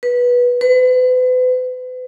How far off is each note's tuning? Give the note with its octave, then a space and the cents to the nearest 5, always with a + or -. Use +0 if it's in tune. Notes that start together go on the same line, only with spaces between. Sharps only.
B4 -15
B4 +40